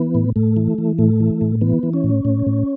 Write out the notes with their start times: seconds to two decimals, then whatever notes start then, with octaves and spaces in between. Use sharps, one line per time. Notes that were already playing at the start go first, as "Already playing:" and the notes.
Already playing: E3 B3
0.15 A2
0.36 A2 A3
0.57 E3
0.78 E3
0.99 A2 A3
1.20 E3
1.41 A2
1.61 E3 B3
1.83 E3
1.93 C#4
2.04 A2
2.25 A2
2.47 A2